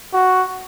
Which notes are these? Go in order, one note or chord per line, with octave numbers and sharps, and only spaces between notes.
F#4